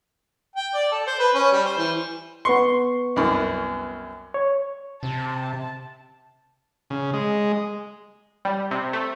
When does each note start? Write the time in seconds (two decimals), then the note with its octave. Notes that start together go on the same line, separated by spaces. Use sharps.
0.55 G5
0.74 D5
0.91 A4
1.07 C5
1.19 B4
1.35 C#4
1.52 G3
1.65 C5
1.78 E3
2.45 B3 B4 C6 C#6
3.16 C2 F#2
4.34 C#5
5.03 C3 A5
6.90 C#3
7.14 G#3
8.45 G3
8.71 C3
8.93 A3